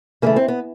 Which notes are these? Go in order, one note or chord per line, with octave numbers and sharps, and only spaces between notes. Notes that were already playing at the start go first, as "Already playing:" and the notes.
C#3 E3 A3 A#3
C4
B3